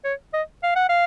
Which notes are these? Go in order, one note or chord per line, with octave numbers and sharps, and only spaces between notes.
C#5
D#5
F5
F#5
F5